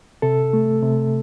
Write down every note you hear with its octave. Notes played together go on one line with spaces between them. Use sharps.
C3 A4
A3
C3